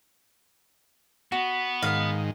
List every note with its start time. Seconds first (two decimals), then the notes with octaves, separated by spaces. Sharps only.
1.32 B3 F#4
1.83 G#2 D#3 F5